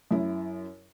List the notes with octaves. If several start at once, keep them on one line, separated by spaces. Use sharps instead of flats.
F#2 E4